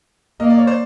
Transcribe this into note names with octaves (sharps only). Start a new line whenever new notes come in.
A#3 D#5
D5
C#5
C5 D5